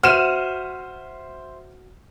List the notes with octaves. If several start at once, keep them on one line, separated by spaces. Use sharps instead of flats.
F#4 C5 E5 F6 D#7 E7